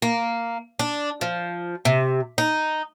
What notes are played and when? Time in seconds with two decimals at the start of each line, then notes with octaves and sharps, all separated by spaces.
0.02 A#3
0.79 D4
1.21 F3
1.85 C3
2.38 D#4